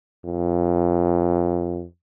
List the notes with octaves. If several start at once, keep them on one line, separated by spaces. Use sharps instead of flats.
F2